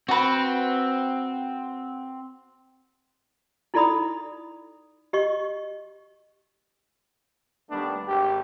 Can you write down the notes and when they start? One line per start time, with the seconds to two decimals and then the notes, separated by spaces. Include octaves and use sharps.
0.08 C4 F#4 B4
3.74 D#4 E4 A4 D5 B5 D#6
5.13 G4 D#5 C#6
7.70 D#2 G3 A3 B3 D4
8.07 G#1 G4